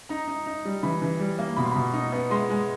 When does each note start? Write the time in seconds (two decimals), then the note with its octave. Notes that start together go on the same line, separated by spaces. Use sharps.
0.09 D#4 A#5
0.28 D#4
0.46 D#4
0.65 G3
0.83 E3 B5
1.02 E3
1.20 G3
1.39 A#3
1.56 B2 B5
1.65 C6
1.71 B2 B5
1.93 D#4
2.12 B3
2.30 G#3 C6
2.50 G#3